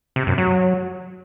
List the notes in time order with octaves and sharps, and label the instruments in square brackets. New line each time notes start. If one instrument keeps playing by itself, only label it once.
[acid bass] C3
F#2
F#3